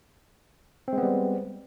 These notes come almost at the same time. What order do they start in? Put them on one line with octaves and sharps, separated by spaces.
C4 G#3 B3 G3